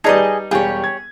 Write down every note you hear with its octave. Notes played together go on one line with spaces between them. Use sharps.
G3 D#4 G#4 A#4 B4 D5 D#5 A5
E1 G3 G4 G#4 C#5 F5
G#6